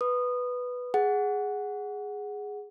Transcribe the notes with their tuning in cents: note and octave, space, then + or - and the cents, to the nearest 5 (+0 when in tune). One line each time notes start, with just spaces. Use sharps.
B4 +0 D#6 -20
G#4 +0 F#5 +0